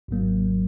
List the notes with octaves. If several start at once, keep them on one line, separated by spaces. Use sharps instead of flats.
G#1 G#2 F#3 A#3